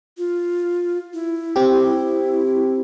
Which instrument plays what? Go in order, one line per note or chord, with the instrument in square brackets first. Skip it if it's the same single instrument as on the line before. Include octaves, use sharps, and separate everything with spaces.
[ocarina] F4
E4
[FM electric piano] C4 G4
[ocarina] E4